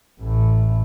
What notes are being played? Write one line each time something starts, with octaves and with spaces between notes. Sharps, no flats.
A1 A2